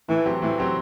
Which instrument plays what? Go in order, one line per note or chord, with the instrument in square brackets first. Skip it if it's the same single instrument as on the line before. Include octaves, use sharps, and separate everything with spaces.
[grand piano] A2 [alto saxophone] E3
[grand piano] F#3 C4 G4
[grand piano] A2 [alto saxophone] E3
[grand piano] F#3 C4 G4